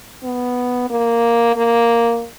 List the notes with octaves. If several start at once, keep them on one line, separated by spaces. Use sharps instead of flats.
B3
A#3
A#3